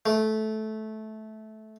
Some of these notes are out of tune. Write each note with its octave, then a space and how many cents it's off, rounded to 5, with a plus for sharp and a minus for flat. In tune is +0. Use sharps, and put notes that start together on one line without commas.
A3 -15